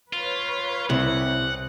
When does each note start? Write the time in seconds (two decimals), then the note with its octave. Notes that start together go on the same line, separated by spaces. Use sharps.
0.13 F4 B4 C#5
0.90 C2 C3 C4 F#5 G#6